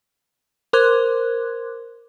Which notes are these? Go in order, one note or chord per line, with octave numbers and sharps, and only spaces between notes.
A#4 C5 C6 D6 F#6 G#6